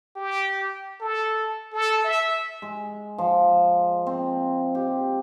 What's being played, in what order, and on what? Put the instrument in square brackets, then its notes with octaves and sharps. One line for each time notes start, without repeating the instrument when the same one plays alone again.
[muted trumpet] G4
A4
A4
E5
[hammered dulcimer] G#3
F3
C4
G4